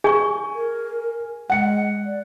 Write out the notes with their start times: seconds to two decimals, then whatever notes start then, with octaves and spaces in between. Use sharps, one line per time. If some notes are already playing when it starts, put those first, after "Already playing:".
0.04 G#4 G#5 C#6
0.54 A#4
1.50 G#3 F#5 C#7
2.06 D5